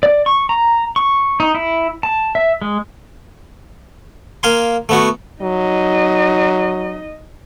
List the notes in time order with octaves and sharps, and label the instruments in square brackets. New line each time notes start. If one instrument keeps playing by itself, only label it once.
[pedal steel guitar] D5
C#6
A#5
C#6
D#4
E4
A5
E5
G#3
[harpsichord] A#3 F5 G#5 C6
A3 B3 F#4
[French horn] F#3 [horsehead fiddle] D#4 D#5